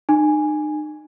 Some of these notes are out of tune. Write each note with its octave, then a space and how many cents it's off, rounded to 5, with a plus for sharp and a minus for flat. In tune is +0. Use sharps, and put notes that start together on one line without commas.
D#4 -40 G#5 +0